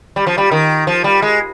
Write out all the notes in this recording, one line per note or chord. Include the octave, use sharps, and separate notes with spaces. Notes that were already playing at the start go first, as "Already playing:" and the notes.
G3
F3
G3
D#3
F3
G3
G#3